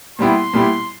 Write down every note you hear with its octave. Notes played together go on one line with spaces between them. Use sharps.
A#2 G3 B3 E4 G4 C6
A#2 G3 B3 E4 G4